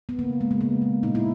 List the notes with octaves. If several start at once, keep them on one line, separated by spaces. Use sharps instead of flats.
B3
C#3 A#3
G#3
A#3
C#3 B3
G#3
A#2 D#4
E4